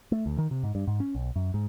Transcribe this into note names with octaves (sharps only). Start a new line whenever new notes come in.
A3
D2
D#3
C3
G#2
G2
G#2
C#4
B1
F#2
G#2